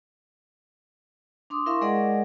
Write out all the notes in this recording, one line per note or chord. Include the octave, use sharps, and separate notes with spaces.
D4 C6 D6 D#6
E4 A#4 E5 F5 C6 C#6
G#3 G#4 A#4 D5 D#5 F#5